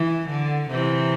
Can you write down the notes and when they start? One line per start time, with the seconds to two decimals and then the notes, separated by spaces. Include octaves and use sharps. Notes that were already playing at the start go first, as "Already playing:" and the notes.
Already playing: E3
0.30 D3
0.71 C3 E3